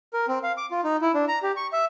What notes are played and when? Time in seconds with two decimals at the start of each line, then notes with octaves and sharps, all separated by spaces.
0.13 A#4
0.28 C4
0.43 F5
0.57 D6
0.71 F4
0.84 D#4
1.02 E4
1.14 D4
1.28 A#5
1.43 G4
1.56 C#6
1.73 E5